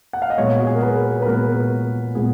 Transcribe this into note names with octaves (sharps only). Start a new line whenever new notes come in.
F#5
F5
D#5
A#2 G#3 B3 C#5
F#4
G#4
A#4
B4
B4
A#2 G#3 B3 A#4
A#2 G#3 B3 G#4